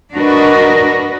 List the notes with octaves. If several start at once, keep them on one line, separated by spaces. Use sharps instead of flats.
D4 F#4 A#4 B4 D#5